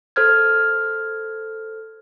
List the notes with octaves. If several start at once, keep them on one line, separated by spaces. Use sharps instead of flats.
A4 C5 F6 G#6